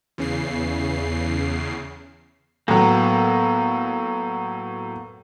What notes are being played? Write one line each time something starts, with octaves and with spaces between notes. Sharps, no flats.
E2 C#3 C7
A2 F#3 A#3 B3